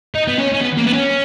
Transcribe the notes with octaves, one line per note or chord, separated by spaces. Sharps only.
D#4
B3
C#4
C#4
B3
A#3
B3
C#4